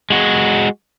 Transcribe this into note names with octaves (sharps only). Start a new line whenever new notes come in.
G#3 F#4